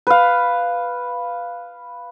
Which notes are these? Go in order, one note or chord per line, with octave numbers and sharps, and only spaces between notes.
B4 F5